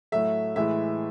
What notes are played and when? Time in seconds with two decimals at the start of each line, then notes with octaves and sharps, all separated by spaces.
0.12 A2 F#3 A3 E5
0.56 A2 E3 G#3 E5